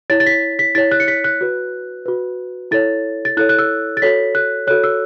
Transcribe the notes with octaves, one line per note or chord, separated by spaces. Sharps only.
E4 C#5 A6
A6
B6
B6
E4 C#5 A6
F#6
C#7
B6
F#6
F#4 B4
F#4 B4
E4 A4 C#5 A6
A6
E4 A4 C#5 F#6
F#6
E6
A6
F#4 A4 C#5 B6
F#6
F#4 A4 C#5 F#6
E6